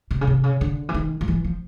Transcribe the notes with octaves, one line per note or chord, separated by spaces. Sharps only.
C3
C#3
C3
C#3
D3
E3
D#3
F3
E3
F3